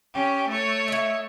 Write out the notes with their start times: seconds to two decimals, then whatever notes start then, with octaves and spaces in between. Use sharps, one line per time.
0.13 C#4 G4
0.48 A3 C#5
0.88 E4 D#5